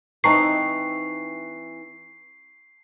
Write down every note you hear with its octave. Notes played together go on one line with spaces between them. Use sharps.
E3 C4 D#4 A5 A#5 C#6 C7